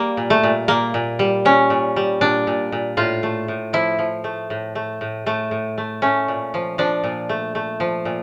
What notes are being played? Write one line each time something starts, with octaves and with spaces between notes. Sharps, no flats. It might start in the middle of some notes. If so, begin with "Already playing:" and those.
Already playing: G3 A#3
A#2
A3
A#2
A#2 A#3
A#2
G3
A#2 C#4
A#2
G3
A#2 D4
A#2
A#2
A2 F4
A3
A2
F3 E4
F3
A3
A2
A3
A2
A2 A3
A2
A3
A3 C#4
A#2
F3
F3 D4
A#2
A3
A3
F3
A#2